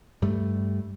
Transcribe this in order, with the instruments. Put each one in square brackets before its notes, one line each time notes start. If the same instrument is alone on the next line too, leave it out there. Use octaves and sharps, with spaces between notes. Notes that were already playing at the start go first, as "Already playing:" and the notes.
[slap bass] G2 G3 A3